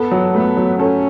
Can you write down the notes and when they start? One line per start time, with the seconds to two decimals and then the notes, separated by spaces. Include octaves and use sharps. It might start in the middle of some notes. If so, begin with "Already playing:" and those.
Already playing: B3 A4
0.11 F#3
0.34 A3 B3
0.57 F#3
0.79 C#4 A4